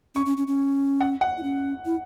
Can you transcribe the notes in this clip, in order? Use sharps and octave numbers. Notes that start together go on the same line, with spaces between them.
C#4 C#6
C#4
C#4
C#4
F#5
F#5
E4
C#4
E4